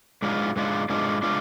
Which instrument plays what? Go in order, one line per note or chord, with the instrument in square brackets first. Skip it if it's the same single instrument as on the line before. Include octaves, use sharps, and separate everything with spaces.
[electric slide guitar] G#2 G#3 D4 F4
G#2 G#3 D4 F4
G#2 G#3 D4 F4
G#3 D4 F4